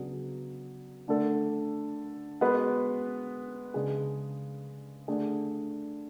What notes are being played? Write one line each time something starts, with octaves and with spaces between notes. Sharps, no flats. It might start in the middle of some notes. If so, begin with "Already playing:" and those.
Already playing: C#3 F#3 B3 D4 G#4
D3 A3 D4 A4
G#3 B3 F#4 B4
C#3 G#3 D4 G#4
D3 A3 D4 G#4 D5